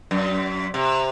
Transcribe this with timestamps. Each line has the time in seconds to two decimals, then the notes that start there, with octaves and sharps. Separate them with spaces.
0.11 F#2
0.74 C3